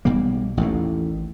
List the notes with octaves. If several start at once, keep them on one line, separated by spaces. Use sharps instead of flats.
B1 B2 G3 A#3
A1 D#2 A2